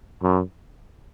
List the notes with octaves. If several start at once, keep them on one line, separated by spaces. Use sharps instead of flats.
F#2